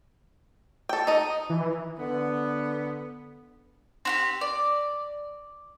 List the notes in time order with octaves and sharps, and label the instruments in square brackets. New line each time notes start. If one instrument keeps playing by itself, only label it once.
[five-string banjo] A4 G5
D#4 D#5
[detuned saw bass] E3
[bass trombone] D3 [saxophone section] B3
[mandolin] C4 F#4 G4
D5